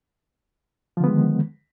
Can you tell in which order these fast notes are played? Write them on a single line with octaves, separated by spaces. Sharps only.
F3 D3 B3 G#3 D#3